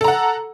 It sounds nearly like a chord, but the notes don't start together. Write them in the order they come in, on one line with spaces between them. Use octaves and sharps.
A4 A#5 F#5